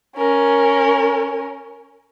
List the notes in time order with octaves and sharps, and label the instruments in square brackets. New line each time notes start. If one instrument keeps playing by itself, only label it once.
[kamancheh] C#4 A#4